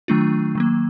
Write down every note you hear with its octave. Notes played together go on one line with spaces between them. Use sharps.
D#3 F#3 A3 D4 F4
D#3 F#3 A#3